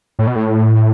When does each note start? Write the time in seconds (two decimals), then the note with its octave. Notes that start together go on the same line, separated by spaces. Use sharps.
0.19 A2
0.27 B2
0.36 A2